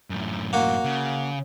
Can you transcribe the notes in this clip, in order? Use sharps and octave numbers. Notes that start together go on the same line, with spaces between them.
F#2 A2
A#3 F#4
C#3